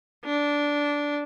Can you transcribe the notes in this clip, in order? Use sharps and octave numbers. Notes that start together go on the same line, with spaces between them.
D4